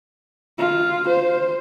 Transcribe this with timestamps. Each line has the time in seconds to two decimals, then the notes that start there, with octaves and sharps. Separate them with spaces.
0.58 F4
1.08 C5